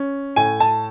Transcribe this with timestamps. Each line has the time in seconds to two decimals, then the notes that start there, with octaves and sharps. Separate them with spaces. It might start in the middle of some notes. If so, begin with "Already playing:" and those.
Already playing: C#4
0.36 A2 G#5
0.60 A5